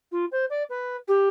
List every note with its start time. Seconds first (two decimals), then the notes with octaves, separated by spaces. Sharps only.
0.12 F4
0.31 C5
0.50 D5
0.69 B4
1.08 G4